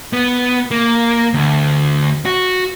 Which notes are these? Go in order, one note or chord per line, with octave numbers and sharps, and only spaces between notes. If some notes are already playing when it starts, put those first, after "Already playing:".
B3
A#3
D2
F#4